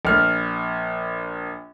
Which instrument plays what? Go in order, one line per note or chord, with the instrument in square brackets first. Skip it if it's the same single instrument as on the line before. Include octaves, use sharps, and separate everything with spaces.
[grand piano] A#1 F6